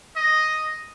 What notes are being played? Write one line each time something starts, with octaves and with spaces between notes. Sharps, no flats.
D#5